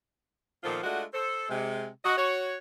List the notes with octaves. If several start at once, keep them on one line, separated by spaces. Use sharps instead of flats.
A#2 D#3 F3 B3 F4 A4
G#3 A3 D4 F4 F#4
A4 C5
C3 G#3
F#4 D#5
F#4 C#5